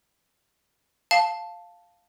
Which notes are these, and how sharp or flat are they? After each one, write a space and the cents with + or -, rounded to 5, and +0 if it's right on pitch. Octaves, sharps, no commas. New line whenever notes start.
F5 +0 A5 +0